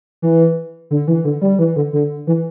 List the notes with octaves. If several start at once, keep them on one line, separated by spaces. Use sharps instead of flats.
E3
D3
E3
D3
G3
E3
D3
D3
E3